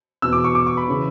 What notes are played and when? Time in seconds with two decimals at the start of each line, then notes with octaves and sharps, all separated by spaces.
0.22 E2 B2 E6
0.33 D6
0.44 C#6
0.55 D6
0.67 C#6
0.77 B5
0.87 C#3 E3